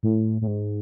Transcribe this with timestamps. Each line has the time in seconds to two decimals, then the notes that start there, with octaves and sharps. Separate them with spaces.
0.03 A2
0.42 A2
0.47 G#2